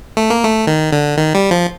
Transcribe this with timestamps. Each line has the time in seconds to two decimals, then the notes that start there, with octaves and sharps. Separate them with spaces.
0.17 A3
0.30 A#3
0.45 A3
0.67 D#3
0.92 D3
1.17 D#3
1.34 G3
1.51 F3